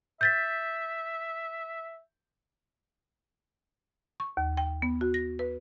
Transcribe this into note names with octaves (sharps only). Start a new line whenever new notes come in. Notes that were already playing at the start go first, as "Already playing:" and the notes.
E5 G6 A6 B6
C#6
D#2
G5
B3
F#4
A#6
B4